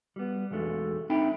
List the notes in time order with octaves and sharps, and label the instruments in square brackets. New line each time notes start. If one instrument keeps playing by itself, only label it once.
[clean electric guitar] G3 B3
B1 E2 G#3 A3 D4
C4 D4 D#4 E5 G5 B5